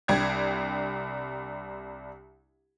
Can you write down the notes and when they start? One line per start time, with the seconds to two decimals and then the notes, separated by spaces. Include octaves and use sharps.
0.08 C2 D4 G5 G#6